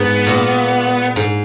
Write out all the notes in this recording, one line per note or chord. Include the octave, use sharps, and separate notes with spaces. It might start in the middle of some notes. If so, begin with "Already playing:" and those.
Already playing: G#2 B3
A#2
G#2